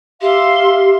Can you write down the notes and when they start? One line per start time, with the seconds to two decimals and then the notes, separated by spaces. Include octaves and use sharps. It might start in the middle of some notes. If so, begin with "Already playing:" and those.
0.22 G4 E5 F5 C6